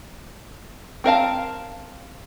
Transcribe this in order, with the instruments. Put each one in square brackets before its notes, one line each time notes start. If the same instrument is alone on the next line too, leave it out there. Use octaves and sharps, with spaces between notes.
[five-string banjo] C4 A#4 F5 A5